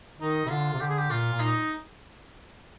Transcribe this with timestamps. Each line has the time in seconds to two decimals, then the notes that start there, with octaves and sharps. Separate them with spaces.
0.20 D#3 D#4
0.45 C3
0.50 D3 F4
0.73 C3
0.80 D3 G4
0.89 G#4
0.98 G4
1.10 A#2 F4
1.33 A#2
1.40 D#4